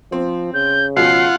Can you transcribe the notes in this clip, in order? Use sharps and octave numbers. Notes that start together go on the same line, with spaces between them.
F3 C4
C#3 G6
B2 F3 F4 G#4 F#5 C7